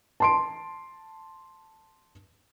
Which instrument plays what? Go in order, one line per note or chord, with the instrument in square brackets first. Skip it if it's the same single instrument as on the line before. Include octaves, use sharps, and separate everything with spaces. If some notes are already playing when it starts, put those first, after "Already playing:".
[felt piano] A5 C6 D7